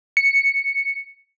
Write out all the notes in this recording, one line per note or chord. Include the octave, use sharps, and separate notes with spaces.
C#7